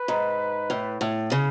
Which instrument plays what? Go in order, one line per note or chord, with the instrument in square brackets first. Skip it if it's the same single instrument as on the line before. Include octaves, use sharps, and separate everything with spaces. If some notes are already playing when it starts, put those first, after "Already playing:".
Already playing: [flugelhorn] B4
[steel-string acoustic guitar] G#2
A2
A2
C#3